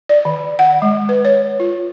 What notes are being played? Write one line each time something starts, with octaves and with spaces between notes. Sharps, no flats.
D5
D#3
F#5
G#3
B4
C#5
F4